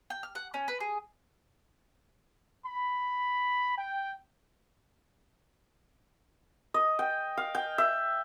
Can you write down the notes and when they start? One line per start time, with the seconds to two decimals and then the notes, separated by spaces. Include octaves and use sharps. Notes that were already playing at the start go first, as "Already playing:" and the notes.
0.10 G5
0.23 F6
0.35 F#5
0.54 C#4
0.68 B4
0.80 G#4
2.66 B5
3.77 G5
6.74 D#5
6.99 G5
7.37 F5
7.55 G5
7.78 E5